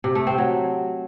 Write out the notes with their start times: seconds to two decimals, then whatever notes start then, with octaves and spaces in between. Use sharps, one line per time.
0.04 C3
0.15 A3
0.27 C4
0.38 F#3